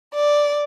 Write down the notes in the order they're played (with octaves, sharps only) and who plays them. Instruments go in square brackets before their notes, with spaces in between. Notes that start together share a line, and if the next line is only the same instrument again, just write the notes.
[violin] D5